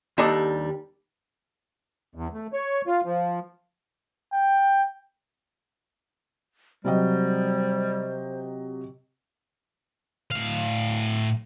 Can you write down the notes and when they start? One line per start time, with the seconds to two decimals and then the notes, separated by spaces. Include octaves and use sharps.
0.18 D#2 G3 D4 A4 D#5 A#5
2.15 E2
2.34 A3
2.53 C#5
2.87 F4
3.06 F3
4.33 G5
6.85 C3 F#3 G3 C5 D#5
10.31 A2 F5